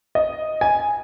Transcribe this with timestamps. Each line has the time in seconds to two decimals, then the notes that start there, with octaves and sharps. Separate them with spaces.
0.15 D#5
0.61 G#5